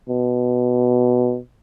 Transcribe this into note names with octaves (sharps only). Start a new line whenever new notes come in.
B2